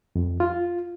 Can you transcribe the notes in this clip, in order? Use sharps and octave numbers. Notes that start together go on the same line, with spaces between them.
F2
F4